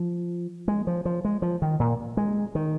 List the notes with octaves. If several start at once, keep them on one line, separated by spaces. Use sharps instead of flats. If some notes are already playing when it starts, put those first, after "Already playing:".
Already playing: F3
G#3
F3
F3
G#3
F3
D#3
A#2
G#3
D#3